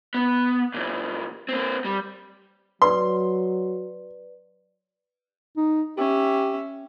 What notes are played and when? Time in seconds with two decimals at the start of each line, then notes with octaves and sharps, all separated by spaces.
0.14 B3
0.74 A#2 E3
1.49 A#3 C4
1.85 G3
2.82 F#3 B4 D5 C6
5.57 D#4
5.98 C#4 G4 E5